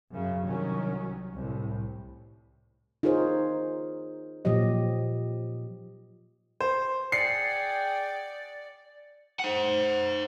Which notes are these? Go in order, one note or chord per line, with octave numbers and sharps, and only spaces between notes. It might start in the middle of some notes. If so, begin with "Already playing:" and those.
F#2 C#3
C2 D#3 F#3 C#4
C2 A2
D#4 F4 G#4 A#4 C5 C#5
A#2 F3 F#3 G4 D#5
C5
G#4 D5 F#5 G5 C7 C#7
C5 F#5